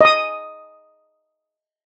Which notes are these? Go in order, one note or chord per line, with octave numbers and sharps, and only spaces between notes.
D#5 D#6